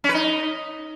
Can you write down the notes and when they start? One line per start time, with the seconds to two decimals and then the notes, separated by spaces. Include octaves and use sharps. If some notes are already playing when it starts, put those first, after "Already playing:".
0.04 C#4
0.09 B4
0.14 D#4